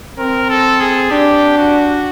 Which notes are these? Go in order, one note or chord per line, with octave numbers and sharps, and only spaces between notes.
C4 A#4
A4
G#4
D4 G4
F#4